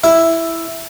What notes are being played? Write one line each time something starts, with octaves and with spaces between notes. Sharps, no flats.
E4